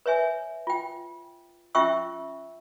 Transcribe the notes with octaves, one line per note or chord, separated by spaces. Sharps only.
B4 C#5 E5 G#5
F4 G5
C#4 F4 E5 G5 C#6 E6